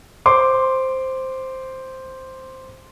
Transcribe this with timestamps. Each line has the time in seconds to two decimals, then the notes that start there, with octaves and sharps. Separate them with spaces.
0.26 C5 C6 D6